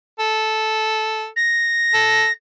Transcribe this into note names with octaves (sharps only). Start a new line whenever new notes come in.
A4
A#6
A4